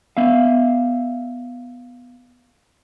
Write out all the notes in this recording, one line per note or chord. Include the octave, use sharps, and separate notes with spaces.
B3 E5 F5